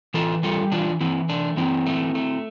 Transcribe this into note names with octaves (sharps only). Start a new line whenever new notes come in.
E3 F4 A4
G3 F4 A4
E3 D4 F4
E3 C4 E4
A3 D4
E3 C4 E4
A3
A3